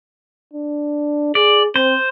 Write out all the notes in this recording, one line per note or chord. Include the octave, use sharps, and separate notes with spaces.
D4
G#4 D5
C4 C5